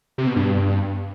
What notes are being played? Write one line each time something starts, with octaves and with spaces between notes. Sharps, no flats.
C3
B2
G2